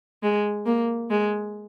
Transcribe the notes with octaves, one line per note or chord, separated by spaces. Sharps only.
G#3
A#3
G#3